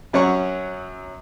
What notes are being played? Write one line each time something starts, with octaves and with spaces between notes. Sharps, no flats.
F#2 F#3 C#4 F#5 C#6